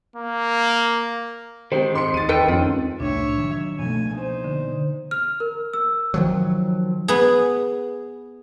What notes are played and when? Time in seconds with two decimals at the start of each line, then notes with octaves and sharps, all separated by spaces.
0.16 A#3
1.72 D#3 G#3 C4 G4 C5
1.93 G#2 C6 C#7
2.14 E2 A6 D#7
2.29 D#4 A4 B4 G5 C#7
2.48 F2 C4 C#4 F4
3.00 C2 A2 D4 C#5 E5
3.38 D#3 E3 F#3
3.79 B2 F3 A3 A#3 G#5
4.14 D#4 C5
4.44 D3
5.11 F6
5.40 A#4
5.74 E6
6.14 D#3 F3 F#3
7.08 B3 G#4